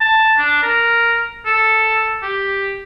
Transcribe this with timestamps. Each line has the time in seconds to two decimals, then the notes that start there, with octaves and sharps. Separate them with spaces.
0.01 A5
0.39 D4
0.63 A#4
1.46 A4
2.22 G4